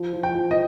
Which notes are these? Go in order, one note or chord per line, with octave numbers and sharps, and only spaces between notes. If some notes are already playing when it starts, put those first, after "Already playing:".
Already playing: F3
F3
G5
F3
D#5